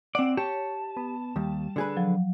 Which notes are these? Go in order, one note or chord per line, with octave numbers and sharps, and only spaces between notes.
C4 D5 F#5
G4 C#5 A5
B3
D#2 G3
D3 G#4 B4
F3 F#3